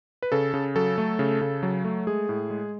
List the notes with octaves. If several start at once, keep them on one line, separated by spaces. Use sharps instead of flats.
B4
C#3 A4
C#3
F#3 A4
A3
C#3
C#3
F#3
A3
G#3 G#4
A2
G#3